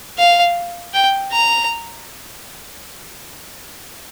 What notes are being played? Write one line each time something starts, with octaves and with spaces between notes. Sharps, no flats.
F5
G5
A#5